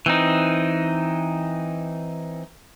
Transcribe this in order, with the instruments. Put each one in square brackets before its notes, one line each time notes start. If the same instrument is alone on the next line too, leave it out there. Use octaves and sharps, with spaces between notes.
[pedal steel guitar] E3 C4 D#4